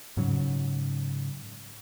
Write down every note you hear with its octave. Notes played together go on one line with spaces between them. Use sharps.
G#2 C#3 F#3